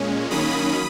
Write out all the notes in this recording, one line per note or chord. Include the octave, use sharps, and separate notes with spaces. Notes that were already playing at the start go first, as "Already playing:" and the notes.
Already playing: A#2 G#3 C#4
D#3 F#3 A#3 C#4 B5 D#6